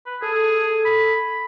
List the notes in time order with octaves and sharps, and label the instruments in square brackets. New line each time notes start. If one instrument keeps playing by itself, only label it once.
[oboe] B4
[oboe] G#4 [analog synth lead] A4
[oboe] B5